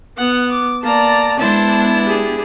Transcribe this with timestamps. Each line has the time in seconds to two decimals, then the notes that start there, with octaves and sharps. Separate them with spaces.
0.17 B3 F#5
0.51 D6
0.83 A#3 D5 A5 A#5
1.39 G#3 B3 D4 E4 C5 A5
2.05 G4 G#4